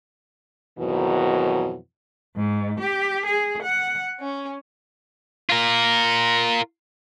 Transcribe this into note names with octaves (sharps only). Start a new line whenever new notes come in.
F2 G#2 B2 D#3 E3 F#3
G#2
G4
G#4
F#5
C#4
F4 A#4